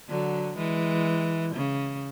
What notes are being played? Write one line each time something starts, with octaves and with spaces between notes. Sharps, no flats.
D3 F#3
E3 G#3
C#3